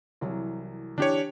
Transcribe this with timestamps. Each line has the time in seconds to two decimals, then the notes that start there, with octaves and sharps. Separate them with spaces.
0.21 C2 E3 F#3
0.98 E3 D4 G4 C#5